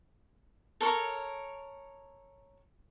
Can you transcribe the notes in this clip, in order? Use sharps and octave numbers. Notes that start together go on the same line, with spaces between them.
A4 A#4 C#5